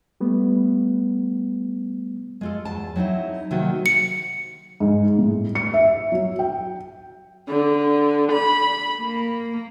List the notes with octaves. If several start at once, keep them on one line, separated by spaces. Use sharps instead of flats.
G3 A3 B3
G#3 F4 A4
E2 A5
F#3 C4 D#4 E4
C3 D#3 F#3 A#3
C#7
G#2
A2
C#7
E5
F#3
G5
D3
B5
A#3